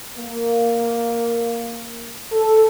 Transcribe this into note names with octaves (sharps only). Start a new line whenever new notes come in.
A#3
A4